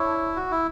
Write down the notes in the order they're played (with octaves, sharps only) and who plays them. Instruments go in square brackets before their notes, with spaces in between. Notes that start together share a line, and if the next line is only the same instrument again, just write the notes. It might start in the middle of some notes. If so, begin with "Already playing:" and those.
Already playing: [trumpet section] D4 A4 C#5 [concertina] E4
[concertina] F#4
E4